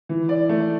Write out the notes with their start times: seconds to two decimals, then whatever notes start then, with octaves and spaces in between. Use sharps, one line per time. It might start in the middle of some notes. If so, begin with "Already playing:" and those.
0.09 E3
0.29 D5
0.49 A3